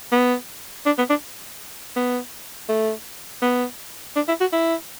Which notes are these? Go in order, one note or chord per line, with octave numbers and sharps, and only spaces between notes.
B3
D4
B3
D4
B3
A3
B3
D4
E4
F#4
E4